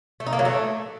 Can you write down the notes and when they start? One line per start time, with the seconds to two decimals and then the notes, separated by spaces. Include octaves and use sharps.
0.20 A3
0.26 D#4
0.33 A#3
0.39 F#3
0.45 A3